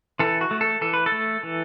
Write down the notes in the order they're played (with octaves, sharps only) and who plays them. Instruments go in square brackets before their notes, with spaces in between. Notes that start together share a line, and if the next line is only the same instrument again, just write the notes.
[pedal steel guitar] E3 A4
F#4
A3
A4
E3 A4
B4
A4
A3
E3